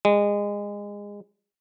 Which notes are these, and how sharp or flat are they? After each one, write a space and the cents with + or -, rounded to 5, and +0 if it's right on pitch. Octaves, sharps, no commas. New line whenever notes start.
G#3 -25